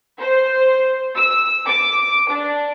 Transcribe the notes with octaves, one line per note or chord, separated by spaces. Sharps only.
C5
E6
D6
D4